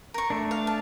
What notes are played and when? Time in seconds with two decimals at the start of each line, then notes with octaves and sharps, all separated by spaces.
0.14 A#4 C#6
0.30 A3 D4
0.51 F5
0.67 A5